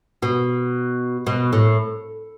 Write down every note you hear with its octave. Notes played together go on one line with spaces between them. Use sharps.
B2
B2
A2